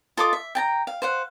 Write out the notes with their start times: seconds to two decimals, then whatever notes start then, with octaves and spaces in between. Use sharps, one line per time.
0.17 F4 A4 D#5 D6
0.33 E5
0.55 G5 A5 A#5
0.87 F5
1.02 C5 F5 F#5